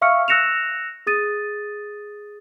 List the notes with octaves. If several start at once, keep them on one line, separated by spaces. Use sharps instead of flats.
E5 F5 C#6 E6 F6 C#7
E6 F#6 A#6 C#7 E7 F7
G#4 D#6 A6 D#7